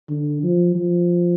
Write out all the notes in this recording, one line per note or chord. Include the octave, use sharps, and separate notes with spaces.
D3
F3
F3